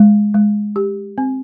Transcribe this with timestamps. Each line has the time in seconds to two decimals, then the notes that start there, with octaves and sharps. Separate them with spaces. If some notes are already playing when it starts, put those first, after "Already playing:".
Already playing: G#3
0.34 G#3
0.76 G4
1.18 C4